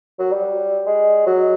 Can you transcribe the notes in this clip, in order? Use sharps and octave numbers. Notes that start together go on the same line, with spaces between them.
F#3
G3
G#3
F#3